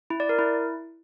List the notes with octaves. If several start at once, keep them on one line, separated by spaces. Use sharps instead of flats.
E4
D5
A#4
E4